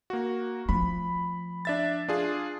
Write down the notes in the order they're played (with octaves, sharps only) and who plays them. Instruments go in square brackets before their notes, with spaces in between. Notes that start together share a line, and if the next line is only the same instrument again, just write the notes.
[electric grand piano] A#3 F#4
[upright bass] F3 A3 [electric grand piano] B5
[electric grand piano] D4 E5 A6
D4 F4 G#4